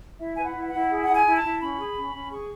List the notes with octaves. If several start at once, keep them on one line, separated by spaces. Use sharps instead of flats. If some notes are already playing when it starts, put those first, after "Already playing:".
E4 E5
G#5
B4
F#5
E4
F#5
E4
G#4
F#5
E4
G#5
E4
A5
E4
C#4 B5
G#4
C#4
C#4
G#4 C#6